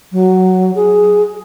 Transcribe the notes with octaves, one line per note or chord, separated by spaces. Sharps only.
F#3
G#4